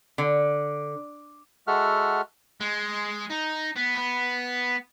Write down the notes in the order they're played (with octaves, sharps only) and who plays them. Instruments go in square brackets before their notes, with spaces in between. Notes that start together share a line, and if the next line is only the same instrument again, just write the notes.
[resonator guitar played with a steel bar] D3
[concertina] G#3 F#4 A4 E5 F#5 F6
[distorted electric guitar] G#3
D#4
B3
B3